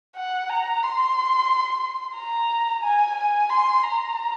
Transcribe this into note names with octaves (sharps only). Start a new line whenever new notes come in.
F#5
A#5
C6
A#5
G#5
G#5
C6
A#5